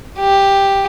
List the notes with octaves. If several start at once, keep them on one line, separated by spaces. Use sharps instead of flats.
G4